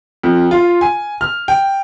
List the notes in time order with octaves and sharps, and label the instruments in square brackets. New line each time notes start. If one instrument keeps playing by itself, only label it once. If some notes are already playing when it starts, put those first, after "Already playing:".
[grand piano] F2
F4
G#5
F6
G5